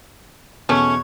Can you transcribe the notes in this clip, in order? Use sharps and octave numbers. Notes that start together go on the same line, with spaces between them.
E2 B2 A3 C#4 C#5 C#6